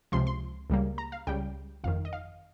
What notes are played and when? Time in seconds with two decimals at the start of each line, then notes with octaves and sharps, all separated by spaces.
0.12 C#2 C3 F3 C6
0.27 C6
0.70 C#2 C#3 G3 A#3
0.98 A#5
1.12 F5
1.27 C#2 C#3 G3 G5
1.84 G1 F2 D#3 F5
2.05 D#5
2.13 F5